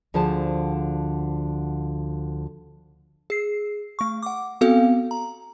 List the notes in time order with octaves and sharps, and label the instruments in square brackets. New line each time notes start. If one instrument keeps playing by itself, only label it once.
[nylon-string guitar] D2 D3 F3 G#4 C5 A5
[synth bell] G#4 C7
A3 C#6
F#5 D6
B3 C4 F#4 A4 F5
A#5